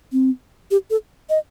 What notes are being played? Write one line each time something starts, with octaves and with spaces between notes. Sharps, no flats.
C4
G4
A4
D#5